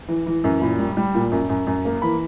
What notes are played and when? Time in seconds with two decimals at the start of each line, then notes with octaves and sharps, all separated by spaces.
0.08 E3
0.26 E3
0.44 F#2
0.61 A#2 B5
0.79 G3
0.97 G3
1.14 A#2
1.32 F#2
1.49 F#2
1.67 F#2
1.85 A#3
2.02 E3 B5